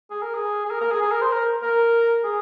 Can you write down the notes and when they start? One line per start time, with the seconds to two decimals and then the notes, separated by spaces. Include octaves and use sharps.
0.11 G#4
0.22 A#4
0.34 G#4
0.66 G#4
0.71 A#4
0.81 A#4
0.91 G#4
1.02 G#4
1.12 A#4
1.21 C5
1.32 A#4
1.62 A#4
2.24 G#4